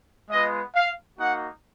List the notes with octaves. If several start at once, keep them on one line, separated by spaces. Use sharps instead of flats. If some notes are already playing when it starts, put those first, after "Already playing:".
G#3 B3 F4 D#5
F5
A#3 D#4 F#4 F#5